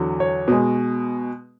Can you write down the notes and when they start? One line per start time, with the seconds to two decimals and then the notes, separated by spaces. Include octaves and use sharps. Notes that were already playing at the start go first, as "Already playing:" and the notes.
Already playing: E2 D3 F#3
0.20 C#5
0.48 B2 G#3